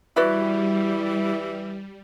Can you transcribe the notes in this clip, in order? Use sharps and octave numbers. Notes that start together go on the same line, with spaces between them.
E3 G3 E4 F#4 B4 D5